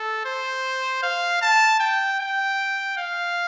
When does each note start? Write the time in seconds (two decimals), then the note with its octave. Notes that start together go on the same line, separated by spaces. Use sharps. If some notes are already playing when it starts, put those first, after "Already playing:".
Already playing: A4
0.25 C5
1.03 F5
1.42 A5
1.80 G5
2.20 G5
2.97 F5